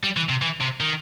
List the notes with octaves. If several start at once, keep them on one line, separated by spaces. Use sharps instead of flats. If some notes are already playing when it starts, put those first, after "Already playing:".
G3
E3
C3
E3
C3
D#3